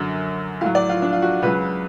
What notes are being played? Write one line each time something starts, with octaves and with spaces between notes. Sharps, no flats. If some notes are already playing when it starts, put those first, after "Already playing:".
Already playing: F#2 D3 F#3
A2 F#3 F5
D5
F4
D4
F4
F#4
C#2 C#3 F#3 B4